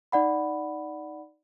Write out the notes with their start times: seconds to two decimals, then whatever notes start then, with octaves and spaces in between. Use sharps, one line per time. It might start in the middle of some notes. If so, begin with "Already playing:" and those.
0.12 D#4 D5 F#5 B5